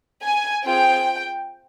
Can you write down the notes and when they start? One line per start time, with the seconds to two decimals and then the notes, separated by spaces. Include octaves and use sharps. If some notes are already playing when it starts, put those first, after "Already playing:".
0.24 G#5
0.65 C4 F4 G#4 G5